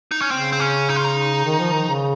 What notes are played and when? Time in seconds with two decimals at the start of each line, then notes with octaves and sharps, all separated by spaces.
0.11 D#4
0.21 C#4
0.31 C#3 C4
0.53 C4
0.60 C#4
0.89 D#4
0.96 F4
1.04 D#4
1.45 D#3
1.59 F3
1.73 D#3
1.88 C#3